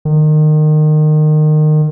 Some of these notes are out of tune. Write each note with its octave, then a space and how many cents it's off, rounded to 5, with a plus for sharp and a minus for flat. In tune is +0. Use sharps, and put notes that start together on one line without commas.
D#3 -25